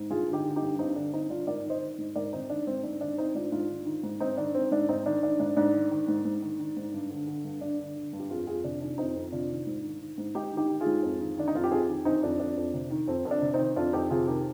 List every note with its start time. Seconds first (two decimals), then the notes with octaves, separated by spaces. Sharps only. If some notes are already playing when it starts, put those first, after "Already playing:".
Already playing: G#2
0.10 G2 F4 G#4
0.28 D3
0.33 D#4 G4
0.45 D3
0.56 D#4 G4
0.62 G2
0.79 G2 C4 D#4
0.96 D3 D4
1.13 D3 C4 D#4
1.30 G2 D4 F4
1.47 G#2 A#4 D5
1.65 D#3
1.70 C5 D#5
1.81 D#3
1.98 G#2
2.16 G#2 A#4 D5
2.33 D#3 C4 D#4
2.49 D#3 D4
2.67 G#2 C4
2.83 G#2 D4
3.01 D#3 D4
3.18 D#3 C4 D#4
3.35 G#2 D4 F4
3.52 G#2 D4 F4
3.69 D#3
3.86 D#3
4.03 G#2
4.20 G#2 C4 D#4
4.37 D#3 D4
4.55 D#3 C4
4.71 G#2 D4
4.89 G#2 C4 D#4
5.06 D#3 D4
5.23 D#3 D4
5.40 G#2 D4
5.56 G#2 D4
5.74 D#3
5.91 D#3
6.08 G#2
6.25 G#2
6.42 D#3
6.60 D#3
6.77 G#2
6.94 G2
7.10 D3
7.27 D3
7.45 G2
7.61 G2 D4
7.79 D3
7.96 D3
8.13 G2
8.20 G4
8.30 F2 F4 G#4
8.47 F2 F4 G#4
8.64 C3 D4
8.81 D#3 D4
8.98 F2 C4 D#4
9.15 F2
9.32 C3 D4 F4
9.50 D#3
9.67 G#2
9.84 D#3
10.01 D#3
10.18 G#2
10.35 G#2 D#4 G4
10.52 D#3
10.57 D#4 G4
10.69 D#3
10.81 F4 G#4
10.86 G#2
11.03 F2
11.20 D#3
11.37 D#3 D4
11.48 D#4
11.55 F2 F4
11.64 G4
11.71 F2 F4 G#4
11.88 D#3
12.05 D#3 C4 D#4
12.23 F2 D4
12.40 F2 D4
12.57 F2
12.74 C3
12.91 D#3
13.08 F2 C4
13.25 F2
13.31 D4
13.42 C3
13.54 C4 D#4
13.59 D#3
13.76 F2 D4 F4
13.93 F2 D#4 G4
14.10 C3 F4 G#4
14.28 D#3 G4 A#4